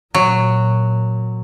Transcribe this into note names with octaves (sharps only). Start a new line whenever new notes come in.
A#2 F#3